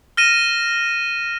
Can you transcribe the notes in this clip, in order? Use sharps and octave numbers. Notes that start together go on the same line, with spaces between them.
F6 A#6 D#7 E7